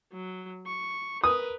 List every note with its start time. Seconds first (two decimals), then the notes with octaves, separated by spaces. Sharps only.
0.13 F#3
0.67 C#6
1.24 A#4 B4 D#6